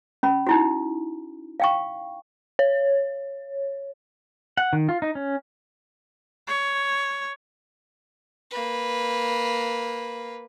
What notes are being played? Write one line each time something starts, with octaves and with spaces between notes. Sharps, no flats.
C#4 B5
D#4 E4 F#4
F5 G5 C#6
C#5
F#5
D#3
F4
D#4
C#4
C#5
A#3 B4